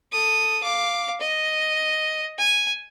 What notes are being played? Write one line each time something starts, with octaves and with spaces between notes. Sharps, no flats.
A4 D#6
F5 D6
D#5
G#5